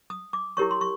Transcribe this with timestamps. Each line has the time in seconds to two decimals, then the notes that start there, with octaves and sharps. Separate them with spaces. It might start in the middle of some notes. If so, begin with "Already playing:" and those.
0.10 D#6
0.33 D6
0.57 E4 G4 A#4 C#5 C#6
0.71 C6
0.81 C#6